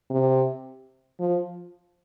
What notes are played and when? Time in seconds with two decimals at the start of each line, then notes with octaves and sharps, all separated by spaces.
0.10 C3
1.20 F3